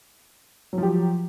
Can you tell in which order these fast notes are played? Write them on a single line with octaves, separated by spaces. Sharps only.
F#3 F3 G4